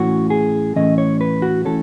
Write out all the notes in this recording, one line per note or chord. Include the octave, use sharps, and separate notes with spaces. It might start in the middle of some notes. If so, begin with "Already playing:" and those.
Already playing: A2 E3 A3 C#4 F#4
G#4
A2 E3 A3 C#4 D#5
C#5
B4
F#4
E3 A3 C#4 A4